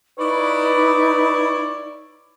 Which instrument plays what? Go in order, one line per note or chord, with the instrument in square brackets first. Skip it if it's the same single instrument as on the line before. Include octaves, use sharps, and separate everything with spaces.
[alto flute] D#4 [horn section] E4 C#5 D5 [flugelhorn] B4